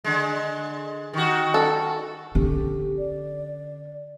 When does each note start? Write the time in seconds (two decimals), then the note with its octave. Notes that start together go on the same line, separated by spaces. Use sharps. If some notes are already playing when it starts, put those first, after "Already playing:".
0.04 D3 G#3
1.13 D#3 F#4
1.54 A4
2.35 D3 C#4 G4
2.98 D5